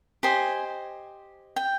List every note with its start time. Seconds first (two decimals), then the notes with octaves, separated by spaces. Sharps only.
0.23 G4 C5 D#5 G#5
1.56 G5